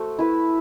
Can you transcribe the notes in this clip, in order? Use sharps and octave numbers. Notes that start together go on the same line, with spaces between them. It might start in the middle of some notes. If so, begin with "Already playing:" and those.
Already playing: A3 F#4 C5
E4 B4